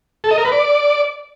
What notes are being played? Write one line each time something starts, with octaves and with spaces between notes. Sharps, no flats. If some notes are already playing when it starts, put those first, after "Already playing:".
A4
D#5
A#4
B4
D5